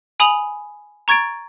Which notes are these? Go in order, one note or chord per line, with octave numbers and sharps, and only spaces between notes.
G#5 B5 D#6 F7 F#7
A#5 C#6 G#6 A6 D7